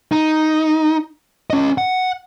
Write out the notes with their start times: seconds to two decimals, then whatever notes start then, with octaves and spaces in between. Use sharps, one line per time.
0.11 D#4
1.50 C#4 D#5
1.78 F#5